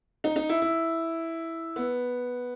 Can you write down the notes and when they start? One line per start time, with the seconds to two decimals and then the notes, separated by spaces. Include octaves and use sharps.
0.24 D#4
0.36 D#4
0.49 E4
0.62 E4
1.76 B3